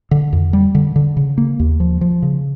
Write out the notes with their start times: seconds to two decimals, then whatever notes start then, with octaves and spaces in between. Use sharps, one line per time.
0.11 D3
0.33 F2
0.53 G3
0.75 D3
0.96 D3
1.17 C#3
1.38 A#3
1.60 D#2
1.80 F3
2.01 F3
2.22 C#3